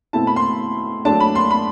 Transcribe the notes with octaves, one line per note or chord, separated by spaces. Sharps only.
B2 A3 C4 E4 A5
B5
C6
F#3 A3 D4 A5
B5
C6
B5